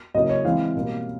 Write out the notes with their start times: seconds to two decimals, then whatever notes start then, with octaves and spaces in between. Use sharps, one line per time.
0.14 C#3 F#3 A#3 C#4 E4 D#5
0.29 C#5
0.44 E3 G#3 C4 E4 F5
0.75 B2 G3 A#3